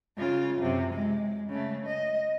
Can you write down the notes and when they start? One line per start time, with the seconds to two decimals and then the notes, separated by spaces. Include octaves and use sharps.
0.17 C#3 F4
0.61 F#2 C3
0.93 G#3
1.50 C#3 A3
1.86 D#5